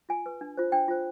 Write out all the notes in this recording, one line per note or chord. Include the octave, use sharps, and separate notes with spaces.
F4 G#5
B4
D4
F4 C5
D4 G5
F4 C5